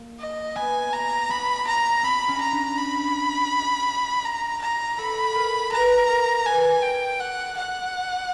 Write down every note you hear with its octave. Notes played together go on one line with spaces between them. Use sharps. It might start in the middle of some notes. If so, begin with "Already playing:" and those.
Already playing: A#3
D#5
B3 G#5
A#5
B3 B5
A#5
C4 B5
C#4
A#5
D4
B5
A#5
A#5
A4 B5
A#4
B4 A#5
A#4
B4 G#5
G5
F#5
F#5